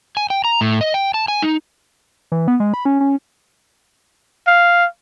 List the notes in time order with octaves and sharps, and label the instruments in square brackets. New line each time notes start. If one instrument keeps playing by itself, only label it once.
[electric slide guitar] G#5
G5
A#5
A2
D#5
G5
A5
G#5
D#4
[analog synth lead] E3
B3
G#3
B5
C#4
C#4
[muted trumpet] F5